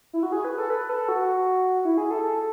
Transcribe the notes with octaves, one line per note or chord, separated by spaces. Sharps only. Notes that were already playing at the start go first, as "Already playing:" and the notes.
E4
F#4
G#4
B4
A4
B4
A4
F#4
E4
G#4
A4
A4